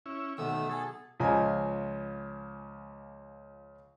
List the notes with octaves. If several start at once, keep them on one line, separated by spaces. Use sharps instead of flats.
C#4 E4
B1 D#3 A3 E6
G#4 A4
C#2 F3 D#5 G#5 A#5